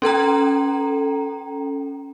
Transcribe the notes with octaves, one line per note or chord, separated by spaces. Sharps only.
C#4 A4 G5 A#5